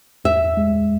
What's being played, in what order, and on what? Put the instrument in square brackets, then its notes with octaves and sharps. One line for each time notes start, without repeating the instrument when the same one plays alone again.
[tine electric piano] E2 [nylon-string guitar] E5
[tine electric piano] G#3